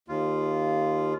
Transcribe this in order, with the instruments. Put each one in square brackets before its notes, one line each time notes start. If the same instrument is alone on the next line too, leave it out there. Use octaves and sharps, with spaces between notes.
[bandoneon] D#2 F4